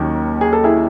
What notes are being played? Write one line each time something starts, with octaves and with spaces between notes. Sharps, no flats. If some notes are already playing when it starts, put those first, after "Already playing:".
Already playing: D#2 D#3 F#3 C#4
G#4
A4
E4 G#4